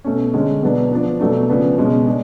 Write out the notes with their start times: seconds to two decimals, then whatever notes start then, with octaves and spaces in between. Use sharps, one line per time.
0.04 B2 A3 C#4
0.33 D3 G#3 C#4
0.63 B2 F#3 B3 D4
0.91 F3 B3 D4
1.19 B2 F#3 A3 D4
1.49 C#3 F3 B3 D4
1.78 B2 G#3 C#4
2.07 G#3 D4